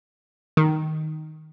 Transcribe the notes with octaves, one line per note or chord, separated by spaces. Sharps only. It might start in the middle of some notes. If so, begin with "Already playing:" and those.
D#3